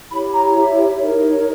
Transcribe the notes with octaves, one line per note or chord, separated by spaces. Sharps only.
E4 G4 C#5 B5
A#5
E5
D#4 A#4 C#5